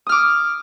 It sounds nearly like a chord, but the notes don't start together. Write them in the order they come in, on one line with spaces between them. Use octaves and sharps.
D#6 F6 D6